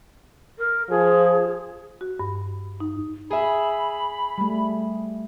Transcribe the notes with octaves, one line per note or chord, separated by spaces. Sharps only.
A#4
F3 G#4
F#4
G2
D#4
G#4 E5 B5
G3 A3